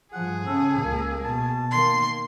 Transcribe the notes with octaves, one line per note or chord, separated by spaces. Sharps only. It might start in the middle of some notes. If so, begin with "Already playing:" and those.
G2 F3 G#4 F#5
C#3 C#4 A4
C#2 A#3
B2 A5
D#3 A#3 C6